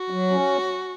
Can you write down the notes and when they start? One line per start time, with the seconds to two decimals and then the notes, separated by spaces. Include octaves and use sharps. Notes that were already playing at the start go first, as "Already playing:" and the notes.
Already playing: F#4
0.10 F#3
0.31 C#4